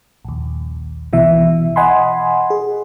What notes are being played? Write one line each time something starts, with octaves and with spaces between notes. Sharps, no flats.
A#1 D#2
B1 B2 E3 E5
D#5 F#5 G#5 B5 C6
G#4